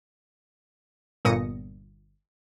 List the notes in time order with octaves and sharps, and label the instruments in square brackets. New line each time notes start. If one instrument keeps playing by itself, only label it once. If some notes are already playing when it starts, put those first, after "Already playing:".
[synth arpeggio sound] G1 A#2 D#6 A#6 C#7